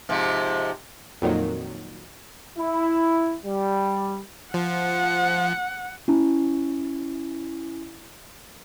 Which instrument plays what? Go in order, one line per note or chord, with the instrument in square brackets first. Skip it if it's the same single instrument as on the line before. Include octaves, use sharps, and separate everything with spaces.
[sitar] G#2 C3 F3
[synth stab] F2 A#2 D#3 F#3
[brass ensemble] E4
G3
[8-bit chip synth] F3 [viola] F#5
[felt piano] C#4 [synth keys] E4